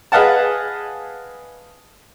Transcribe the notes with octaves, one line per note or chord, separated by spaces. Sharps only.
G#4 B4 D#5 F5 F#5 A5